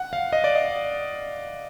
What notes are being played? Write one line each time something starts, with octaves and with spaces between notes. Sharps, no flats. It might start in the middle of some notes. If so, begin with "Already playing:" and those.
Already playing: F#5
F5
D#5
D5
D#5